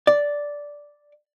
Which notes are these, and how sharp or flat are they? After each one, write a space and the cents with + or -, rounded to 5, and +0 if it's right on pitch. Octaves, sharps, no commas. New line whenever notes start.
D5 -5